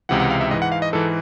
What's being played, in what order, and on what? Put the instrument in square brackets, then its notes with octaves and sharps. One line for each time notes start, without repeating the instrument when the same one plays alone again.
[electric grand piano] C#2 C3 E3 F#5
F#5
F5
E5
G#2 D#5
E3
F#5
F5
D#5
G#2 E3 A4